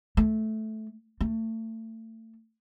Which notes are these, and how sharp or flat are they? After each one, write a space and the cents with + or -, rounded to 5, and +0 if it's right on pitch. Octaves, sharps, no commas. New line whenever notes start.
A3 -10
A3 +30